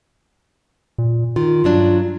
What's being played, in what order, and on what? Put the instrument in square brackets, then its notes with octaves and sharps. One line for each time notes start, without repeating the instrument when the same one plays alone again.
[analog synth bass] A#2
[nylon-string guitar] D#3 [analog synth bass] F4
[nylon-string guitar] G2 F#3 D4